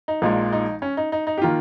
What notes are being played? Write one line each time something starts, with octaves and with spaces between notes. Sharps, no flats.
D#4
A#1 A#2 G#3 D#4
D#4
C#4
D#4
D#4
D#4
G4
D#3 A#3 F4